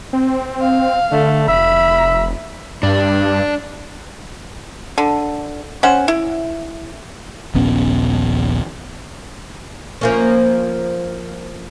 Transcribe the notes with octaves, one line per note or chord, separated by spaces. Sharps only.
C4
F5
D3 A3
F1 E5 B5
G2 D4
D3
C#4 C5 F#5
E4
D#1 A#1 B3 C#4
F3 A#3 C#4